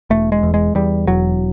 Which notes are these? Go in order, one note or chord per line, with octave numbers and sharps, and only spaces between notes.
E1 A3
G#3
E2
G#3
E2 G3
E1 F#3